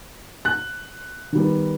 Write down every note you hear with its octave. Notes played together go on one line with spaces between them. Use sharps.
F#6
D#3 G3 B3